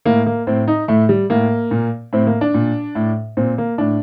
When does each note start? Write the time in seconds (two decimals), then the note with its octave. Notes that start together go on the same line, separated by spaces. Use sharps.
0.05 A2 A#3
0.26 A#3
0.47 A2 C4
0.67 D#4
0.88 A2 A3
1.09 G3
1.30 A2 A#3
1.71 A#2
2.13 A2 C4
2.27 A#3
2.41 D4
2.54 A#2
2.95 A2
3.37 A#2 C4
3.58 A#3
3.78 A2 D4